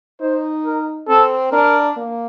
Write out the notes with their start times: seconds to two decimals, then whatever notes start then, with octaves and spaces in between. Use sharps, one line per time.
0.21 D#4 C5
0.65 A#4
1.08 C4 A4
1.52 D4 A#4
1.97 A#3